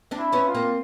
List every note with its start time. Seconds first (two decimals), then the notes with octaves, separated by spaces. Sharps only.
0.11 C4 D4
0.19 E4
0.33 B3 C#4
0.47 F4
0.55 A#3 C4